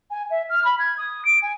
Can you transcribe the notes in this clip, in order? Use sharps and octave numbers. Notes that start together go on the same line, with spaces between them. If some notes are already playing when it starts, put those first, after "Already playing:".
G#5
E5
F6
B5
G#6
D#6
D7
G#5